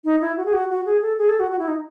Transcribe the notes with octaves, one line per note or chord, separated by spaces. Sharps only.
D#4
E4
F#4
G#4
F#4
F#4
G#4
A4
G#4
A4
F#4
F#4
E4
D#4